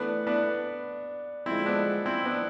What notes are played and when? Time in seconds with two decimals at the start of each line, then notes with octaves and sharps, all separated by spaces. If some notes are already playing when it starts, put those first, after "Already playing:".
Already playing: E3 A3 B3 D4 E4 B4 D5
0.27 B3 D4
1.46 D3 F3 G#3 C4 E4
1.66 B3 D4
2.06 C4 E4
2.25 B3 D4